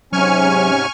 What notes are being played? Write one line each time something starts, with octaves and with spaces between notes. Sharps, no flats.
G#2 C3 F#3 C#4 G#5 C#6 F6